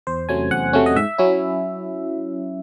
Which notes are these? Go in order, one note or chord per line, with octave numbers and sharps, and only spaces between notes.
E2 C5
C3 F#3 A3 C#4 G#5
E2 F#5
C3 F#3 A3 C#4
D#5
G#2 E5
F#3 C#4 E4